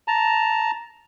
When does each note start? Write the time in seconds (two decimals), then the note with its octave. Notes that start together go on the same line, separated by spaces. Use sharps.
0.08 A5 A#5